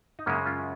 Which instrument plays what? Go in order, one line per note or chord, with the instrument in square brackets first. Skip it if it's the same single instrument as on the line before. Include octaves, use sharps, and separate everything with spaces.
[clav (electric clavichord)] D#4
F#2 C#3 G#3 A#3 C#4
C#4 F4